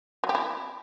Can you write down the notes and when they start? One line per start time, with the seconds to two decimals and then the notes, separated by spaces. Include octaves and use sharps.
0.24 F#3
0.29 G4
0.35 E4